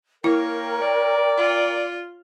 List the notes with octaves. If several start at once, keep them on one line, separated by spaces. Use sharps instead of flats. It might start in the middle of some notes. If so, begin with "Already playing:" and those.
A#3 E4 A#4 C#5 G5
D5
F4